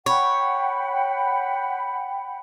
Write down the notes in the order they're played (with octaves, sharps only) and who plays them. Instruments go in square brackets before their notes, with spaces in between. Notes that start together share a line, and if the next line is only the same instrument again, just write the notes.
[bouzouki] C#5 [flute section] F#5 G5 B5